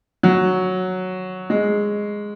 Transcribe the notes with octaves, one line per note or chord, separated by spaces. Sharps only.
F#3
G#3